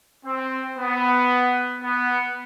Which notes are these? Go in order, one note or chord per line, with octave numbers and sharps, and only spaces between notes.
C4
B3
B3